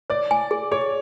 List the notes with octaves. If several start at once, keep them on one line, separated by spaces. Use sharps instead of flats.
C#5 D5
G#5
G#4
G#4 C#5